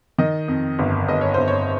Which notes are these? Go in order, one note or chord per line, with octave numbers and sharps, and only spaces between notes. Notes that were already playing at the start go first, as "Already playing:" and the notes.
D#3 D#5
F2
G1
G1 D#5
C#5
G1 C5
C#5